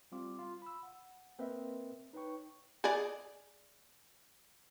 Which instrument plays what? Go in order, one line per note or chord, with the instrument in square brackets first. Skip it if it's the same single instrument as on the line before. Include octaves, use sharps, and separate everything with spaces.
[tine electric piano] G3 C4 F4 D6
F4
B5 E6
F#5
A#3 C4 A#4 B4 D#5 E5
D#4 B4 C#5 G5 C#6
[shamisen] G#4 D5